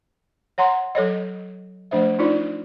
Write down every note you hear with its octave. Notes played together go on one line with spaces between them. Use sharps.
C#5 F#5 A#5 C6
F#3 A4 C#5 D#5
F3 A3 D4 C5 E5
D4 D#4 F4 D5